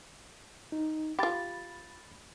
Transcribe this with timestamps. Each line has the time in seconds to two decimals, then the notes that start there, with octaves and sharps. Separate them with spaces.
0.72 D#4
1.19 F4 G4 B5 A6